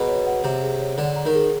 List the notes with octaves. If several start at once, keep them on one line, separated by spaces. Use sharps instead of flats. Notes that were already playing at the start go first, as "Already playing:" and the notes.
Already playing: B2 G#4 F#5 A#5
C#5
F#5
C3 A#5
G#4
C#5
D3 F#5
A#5
D#3
G#4